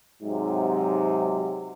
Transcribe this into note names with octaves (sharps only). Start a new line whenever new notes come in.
G#2 C3 F#3